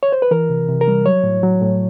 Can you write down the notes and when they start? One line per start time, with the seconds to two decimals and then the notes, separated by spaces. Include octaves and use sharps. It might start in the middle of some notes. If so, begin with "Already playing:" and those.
0.03 C#5
0.12 C5
0.22 B4
0.31 E3 A#4
0.49 C3
0.68 C3
0.81 A#4
0.88 G3
1.06 F#3 C#5
1.23 A2
1.43 F#3
1.62 A2